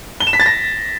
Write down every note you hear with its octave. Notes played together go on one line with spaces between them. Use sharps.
G7
E7
B6
A6
A#6